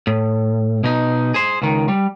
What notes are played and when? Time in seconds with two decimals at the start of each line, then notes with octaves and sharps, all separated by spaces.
0.07 A2
0.84 B2 D#4
1.34 G#4 C5
1.62 C#2 D#3
1.88 G3